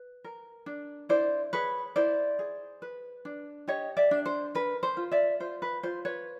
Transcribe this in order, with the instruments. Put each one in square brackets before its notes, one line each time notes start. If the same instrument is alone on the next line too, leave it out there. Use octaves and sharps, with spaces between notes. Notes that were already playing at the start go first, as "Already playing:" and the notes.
Already playing: [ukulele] B4
A#4
D4
E4 C5 D5
G#4 B4 C#5
E4 C5 D5
G#4
B4
D4
G4 C#5 D#5
D5 E5
D4
C5
A#4 B4
C5
F4
D5 E5
F4 C5
B4
F4 C5
B4 C#5